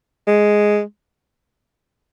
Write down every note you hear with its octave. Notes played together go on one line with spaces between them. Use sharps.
G#3